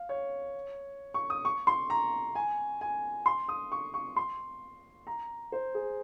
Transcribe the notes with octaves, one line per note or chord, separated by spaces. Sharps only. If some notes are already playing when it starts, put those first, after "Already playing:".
Already playing: F5
C#5
C#6
D#6
C#6
C6
A#5
G#5
G#5
C6
D#6
C#6
C#6
C6
A#5
C5
G#4